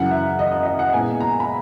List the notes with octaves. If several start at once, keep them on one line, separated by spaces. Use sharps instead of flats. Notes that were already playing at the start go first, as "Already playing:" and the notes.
Already playing: F#2 C#3 E3 F#5
E5
D#5
D#5
D#5
F#5
A#2 G#3 B3 E4 G#5
A#5
B5